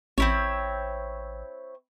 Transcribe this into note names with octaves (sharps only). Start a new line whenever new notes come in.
A1 C4 E4 C#5